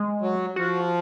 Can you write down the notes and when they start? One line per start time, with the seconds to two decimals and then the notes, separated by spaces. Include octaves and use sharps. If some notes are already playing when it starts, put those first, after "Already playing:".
Already playing: G#3
0.21 F#3
0.56 F3 F#4